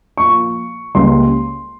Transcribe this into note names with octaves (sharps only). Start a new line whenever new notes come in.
A#2 F3 A#3 C#6
C#2 C#3 G3 A#3 C6